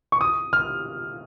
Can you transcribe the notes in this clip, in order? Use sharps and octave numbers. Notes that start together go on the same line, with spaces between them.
C#6
D#6
F6